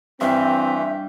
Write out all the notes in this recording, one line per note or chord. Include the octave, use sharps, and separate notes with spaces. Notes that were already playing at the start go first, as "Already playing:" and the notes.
G2 E3 C4 E5 G5